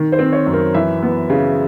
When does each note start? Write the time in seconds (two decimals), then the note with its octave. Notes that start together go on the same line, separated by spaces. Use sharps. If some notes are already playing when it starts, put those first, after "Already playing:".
Already playing: D#3
0.12 C5
0.19 C4
0.32 C#5
0.46 F#2
0.53 A#4
0.74 E3 E5
1.03 B3
1.30 C#3